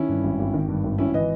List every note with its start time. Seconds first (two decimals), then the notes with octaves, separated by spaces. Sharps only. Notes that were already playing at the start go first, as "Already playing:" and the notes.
Already playing: D#3 C#4 E4
0.09 G2
0.24 G#1
0.39 G#1
0.54 D#3
0.68 G2
0.84 G#1
0.98 G#1 C#4 E4
1.14 E3 B4 D#5